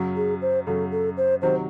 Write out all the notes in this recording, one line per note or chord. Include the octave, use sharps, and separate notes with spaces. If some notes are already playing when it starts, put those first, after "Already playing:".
Already playing: F#2 C#3 F#3
G#4
C5
F#2 C#3 F#3 A4
A4
C5
C3 D#3 F#3 C5